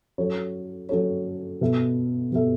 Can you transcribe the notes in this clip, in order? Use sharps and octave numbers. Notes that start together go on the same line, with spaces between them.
F#3 C#4 A4 C#5
F#3 C#4 A4 C#5
B2 B3 A4 E5
B2 B3 A4 E5